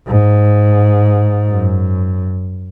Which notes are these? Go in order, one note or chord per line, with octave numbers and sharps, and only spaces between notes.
G#2
F#2